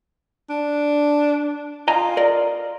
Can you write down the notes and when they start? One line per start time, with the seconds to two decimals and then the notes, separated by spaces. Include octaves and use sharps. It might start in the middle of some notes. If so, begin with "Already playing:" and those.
0.50 D4
1.88 F4 D#5 G#5 A#5
2.17 A#4 D5 D#5